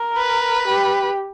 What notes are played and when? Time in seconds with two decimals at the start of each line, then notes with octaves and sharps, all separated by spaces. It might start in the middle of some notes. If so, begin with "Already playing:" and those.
Already playing: A#4
0.17 B4
0.67 G4